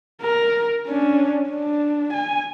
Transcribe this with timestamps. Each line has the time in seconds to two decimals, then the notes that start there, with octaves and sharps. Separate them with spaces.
0.21 A#4
0.87 C#4 D4
1.49 D4
2.14 G#5